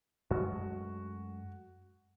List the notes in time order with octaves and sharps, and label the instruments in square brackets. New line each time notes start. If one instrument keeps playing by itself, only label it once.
[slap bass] F#2 G#3 A3 [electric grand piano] F#4